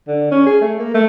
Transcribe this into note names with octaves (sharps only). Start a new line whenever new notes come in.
D3
C#4
G#4
A3
A#3
A3